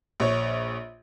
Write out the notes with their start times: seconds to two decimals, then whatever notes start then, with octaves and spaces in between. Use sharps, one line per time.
0.20 A#1 C#5